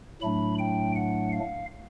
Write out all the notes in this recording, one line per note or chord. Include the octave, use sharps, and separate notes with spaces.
A2 F#3 A3 D4 B5
G5
F#5
F5